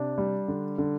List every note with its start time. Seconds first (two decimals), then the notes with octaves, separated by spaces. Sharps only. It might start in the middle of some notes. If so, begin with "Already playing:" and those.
Already playing: C3 D4
0.18 G3
0.48 D3
0.78 D3